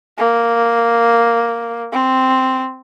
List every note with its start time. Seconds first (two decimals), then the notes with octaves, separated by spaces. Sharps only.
0.18 A#3
1.92 C4